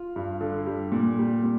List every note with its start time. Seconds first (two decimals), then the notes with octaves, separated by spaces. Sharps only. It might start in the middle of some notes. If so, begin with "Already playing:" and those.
Already playing: F4
0.16 G2
0.41 D3
0.66 G3
0.92 A#2
1.18 G3
1.43 A#2